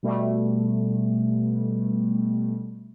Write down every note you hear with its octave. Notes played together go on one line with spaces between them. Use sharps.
B2 G3 A3